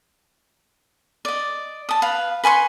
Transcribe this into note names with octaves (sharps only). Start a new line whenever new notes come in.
D5 D#5
A5 D#6
B4 F5
B4 G#5 C6 C#6